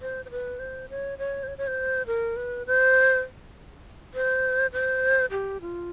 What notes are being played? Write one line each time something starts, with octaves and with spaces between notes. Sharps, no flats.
C5
C5
B4
C5
C#5
C#5
C5
C#5
C#5
C5
A#4
B4
C5
C5
C5
G4
F4